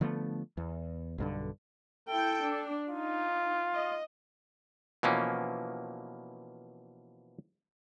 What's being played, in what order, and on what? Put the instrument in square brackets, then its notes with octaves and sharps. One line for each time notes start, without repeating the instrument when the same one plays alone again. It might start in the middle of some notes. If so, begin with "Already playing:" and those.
[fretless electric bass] D3 F3 A3 B3
E2
B1 G2 D3
[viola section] E4 G5 [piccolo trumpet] A4
[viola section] D4
[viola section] D#4 [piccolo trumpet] F4
[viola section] D#5
[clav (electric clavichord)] B2 E3 F3 A#3 C#4